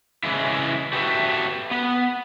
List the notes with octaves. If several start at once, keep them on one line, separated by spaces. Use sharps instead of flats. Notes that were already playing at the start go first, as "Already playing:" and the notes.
C#3 E3 G#3 E4
F#4 G4 A4 B4 D#5 E5
B3